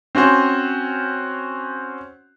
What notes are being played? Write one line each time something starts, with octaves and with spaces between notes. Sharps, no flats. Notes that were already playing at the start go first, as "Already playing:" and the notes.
C4 C#4 F#4 C5